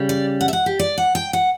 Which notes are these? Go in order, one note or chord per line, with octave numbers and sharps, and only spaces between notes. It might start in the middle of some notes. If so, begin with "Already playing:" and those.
Already playing: C#3 G3
D5
F#5
E5
F#5
G4
D5
F#5
G5
F#5